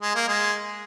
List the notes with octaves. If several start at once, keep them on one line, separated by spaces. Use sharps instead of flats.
G#3
A#3
G#3